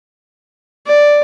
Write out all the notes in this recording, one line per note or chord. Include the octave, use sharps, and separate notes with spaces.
D5